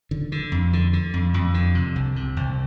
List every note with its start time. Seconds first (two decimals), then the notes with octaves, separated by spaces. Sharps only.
0.11 D3
0.32 D3
0.52 F2
0.73 D3
0.93 D3
1.14 F2
1.34 F2
1.54 D3
1.75 C3
1.96 C2
2.16 C3
2.36 C2